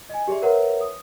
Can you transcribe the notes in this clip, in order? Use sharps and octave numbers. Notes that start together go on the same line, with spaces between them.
D#5 G#5
G4 G#4 D5 E5 C6
A#4 B4 C#5 E5 F#5 A#5
D#6